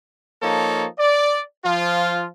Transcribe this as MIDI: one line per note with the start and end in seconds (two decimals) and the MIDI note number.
0.42 0.87 53
0.42 0.87 58
0.42 0.87 63
0.42 0.87 69
0.42 0.87 73
0.99 1.41 74
1.65 2.26 53
1.65 2.26 65